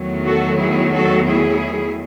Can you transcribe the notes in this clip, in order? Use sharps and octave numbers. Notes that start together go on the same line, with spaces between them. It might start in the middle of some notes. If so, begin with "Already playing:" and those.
Already playing: E2 D#3 F#3 A3
F#4 A4
E4 G#4
F#4 A4
E4 G#4